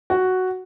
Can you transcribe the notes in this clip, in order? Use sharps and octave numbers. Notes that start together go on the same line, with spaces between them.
F#4